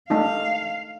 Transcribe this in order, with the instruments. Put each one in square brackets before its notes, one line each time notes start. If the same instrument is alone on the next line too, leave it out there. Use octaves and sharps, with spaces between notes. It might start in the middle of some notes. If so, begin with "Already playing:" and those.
[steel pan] A3 D4 D#4 [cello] F5